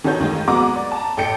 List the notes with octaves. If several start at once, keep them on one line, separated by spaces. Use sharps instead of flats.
D#3 E3 F#4 A4 C#5 G6
D#2 D#3 G#3 A3
F#3 G#3 B3 F#5 A#5 D6
D5
A5 A#5
A1 A4 G5 C#7